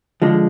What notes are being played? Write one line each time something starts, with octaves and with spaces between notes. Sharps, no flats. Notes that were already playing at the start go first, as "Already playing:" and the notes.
D3 F3 G#3